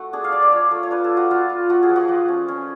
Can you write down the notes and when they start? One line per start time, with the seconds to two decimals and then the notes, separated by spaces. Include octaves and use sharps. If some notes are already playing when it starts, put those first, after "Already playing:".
Already playing: A3 F#4
0.13 D4 G#4
0.24 F5
0.32 A3 D5
0.42 D5
0.52 F4 C#5
0.71 A3
0.83 C#5
0.91 D4 B4
1.04 A4
1.11 F4
1.17 F#4
1.31 A3 F4
1.49 F4
1.69 A3 F#4
1.83 G#4
1.89 F3
1.96 F#4
2.08 F3
2.28 C#4
2.48 C#4